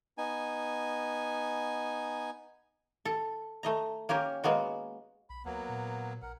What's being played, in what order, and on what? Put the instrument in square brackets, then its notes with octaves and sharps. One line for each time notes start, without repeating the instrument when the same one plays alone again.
[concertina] B3 D#4 G#5
[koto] A4
A3 D#5 A#5
A#3 C#4 G4 A#4
G#3 A#3 B3 F#4
[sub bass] B1 [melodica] B5
[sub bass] D2 [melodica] F#3 A#3 B3
[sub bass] A#2
[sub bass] A#1 [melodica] A#4 F#5